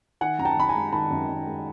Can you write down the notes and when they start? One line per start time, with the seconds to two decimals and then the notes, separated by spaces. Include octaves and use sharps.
0.21 D#3 F#5 G#5
0.39 F#2 A#5
0.45 G5 A5
0.57 F#2 B5
0.69 G#5 A#5
0.75 G#3
0.93 D#3 A5 B5
1.11 F#2
1.29 F#2
1.47 G#3